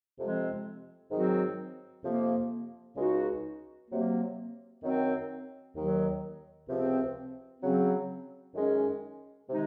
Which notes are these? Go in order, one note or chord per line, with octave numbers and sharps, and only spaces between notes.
F2 C3 F3 G#3 C4
G#2 D#3 F#3 C4 F#4
F2 C3 F3 A#3
C#2 C#3 G#3 D#4 F#4
C3 F#3 A#3
F#2 D#3 F#3 C4
D#2 D#3 F#3
C#2 C3 F3 C4
C#3 F#3 C4
F#2 D#3 G#3 C#4
C3 D#3 G#3 D#4